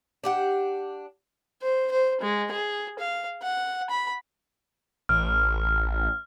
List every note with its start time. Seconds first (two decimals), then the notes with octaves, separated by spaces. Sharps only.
0.24 D4 G4 F#5
1.62 C5
1.91 C5
2.21 G#3
2.52 G#4
2.99 F5
3.43 F#5
3.90 B5
5.09 A1 F6